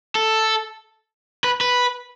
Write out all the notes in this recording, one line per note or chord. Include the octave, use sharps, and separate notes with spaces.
A4
B4
B4